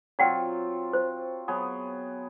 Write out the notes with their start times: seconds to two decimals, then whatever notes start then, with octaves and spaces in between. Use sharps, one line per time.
0.19 F#3 C4 F4 D5 F#5 G5
0.93 C5
1.48 F#3 B3 G#4